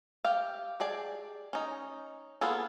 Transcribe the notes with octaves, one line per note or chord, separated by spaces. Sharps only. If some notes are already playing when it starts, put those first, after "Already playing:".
G4 F5
G4 G#4 D5 A5
C#4 D#4
A#3 B3 F4 G#4 A4